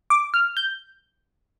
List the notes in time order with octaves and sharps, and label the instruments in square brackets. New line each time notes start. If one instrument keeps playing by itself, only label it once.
[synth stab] D6
F6
G6